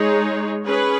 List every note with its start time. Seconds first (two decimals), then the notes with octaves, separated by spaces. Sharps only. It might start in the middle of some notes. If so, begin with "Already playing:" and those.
Already playing: G#3 D#4 G#4 C#5
0.65 C#4 G#4 B4